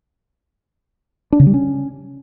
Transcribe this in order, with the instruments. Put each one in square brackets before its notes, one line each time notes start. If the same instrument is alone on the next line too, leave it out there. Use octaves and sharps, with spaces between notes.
[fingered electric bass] D4
C#3
G3
C#4